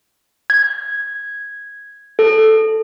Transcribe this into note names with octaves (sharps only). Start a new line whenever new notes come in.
G#6
A4